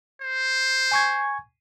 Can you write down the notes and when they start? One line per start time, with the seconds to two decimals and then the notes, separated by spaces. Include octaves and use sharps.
0.22 C5
0.92 G#5 C#6 G#6